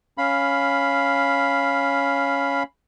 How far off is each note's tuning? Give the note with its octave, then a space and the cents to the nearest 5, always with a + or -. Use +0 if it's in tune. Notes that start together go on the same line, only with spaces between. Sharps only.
C#4 +0 F5 +0 B5 +0